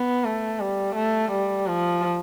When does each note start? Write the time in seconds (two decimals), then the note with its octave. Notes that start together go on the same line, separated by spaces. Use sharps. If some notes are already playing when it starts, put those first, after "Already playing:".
Already playing: B3
0.24 A3
0.60 G3
0.96 A3
1.32 G3
1.68 F3